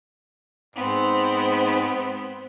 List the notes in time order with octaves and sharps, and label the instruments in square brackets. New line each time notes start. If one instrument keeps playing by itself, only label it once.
[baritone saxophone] G#2 [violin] B3 C4